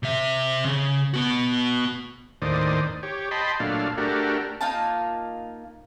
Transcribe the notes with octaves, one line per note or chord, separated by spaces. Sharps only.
C3 E5
C#3
B3 F#4
D#2 A2 D#3 C5 D5 D#6
G4 C#5
D#5 G5 A5 B5 C6
A#2 F#3 A3 D4 F5
A3 D4 F#4 G4 A#4
A#3 D#4 F4 A5